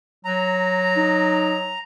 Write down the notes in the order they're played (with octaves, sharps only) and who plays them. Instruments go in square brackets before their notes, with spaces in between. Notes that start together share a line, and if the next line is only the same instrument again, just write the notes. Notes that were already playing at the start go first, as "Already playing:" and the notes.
[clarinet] F#3 [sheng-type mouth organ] A#5
[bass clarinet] D#4